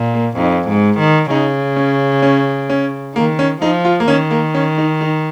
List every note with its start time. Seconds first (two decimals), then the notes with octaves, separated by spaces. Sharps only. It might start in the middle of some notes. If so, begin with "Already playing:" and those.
Already playing: A#2
0.14 A#3
0.38 F2 D#4
0.69 G#2
0.99 D#3
1.30 C#3 D#4
1.76 C#4
2.22 C#4
2.70 C#4
3.15 D#3 A#3
3.39 C#4
3.62 F3 D#4
3.85 F4
4.00 A#3
4.08 D#3 C#4
4.31 A#3
4.54 C#4
4.78 D#4
5.01 D#4